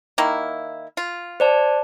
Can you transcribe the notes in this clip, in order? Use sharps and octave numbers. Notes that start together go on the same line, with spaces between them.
D#3 A#3 E4
F4
C5 D5 A5